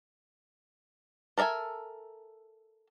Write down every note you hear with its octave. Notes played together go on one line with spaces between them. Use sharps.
A4 A#4 D5 E5 G#5